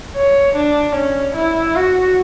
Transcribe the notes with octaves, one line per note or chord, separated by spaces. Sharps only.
C#5
D4
C#4
E4
F#4